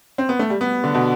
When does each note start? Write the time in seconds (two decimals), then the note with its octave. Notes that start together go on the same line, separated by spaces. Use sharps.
0.18 C4
0.29 B3
0.39 A3
0.50 G3
0.61 B3
0.84 D3
0.95 B2